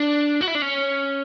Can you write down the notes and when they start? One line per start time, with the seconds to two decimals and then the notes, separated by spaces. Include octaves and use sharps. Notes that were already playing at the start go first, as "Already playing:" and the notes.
Already playing: D4
0.41 F#4
0.48 E4
0.55 D4
0.62 C#4